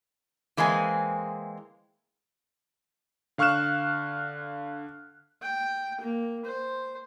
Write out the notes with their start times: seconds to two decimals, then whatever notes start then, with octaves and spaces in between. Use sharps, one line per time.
0.57 E3 G#3 A#3 C4 G#5
3.38 D3 F5 C#6 F6 F#6 E7
5.42 G5
6.00 A#3
6.45 C5